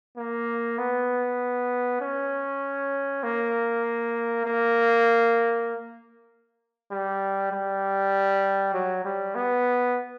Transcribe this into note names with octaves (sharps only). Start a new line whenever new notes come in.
A#3
B3
C#4
A#3
A#3
G3
G3
F#3
G3
B3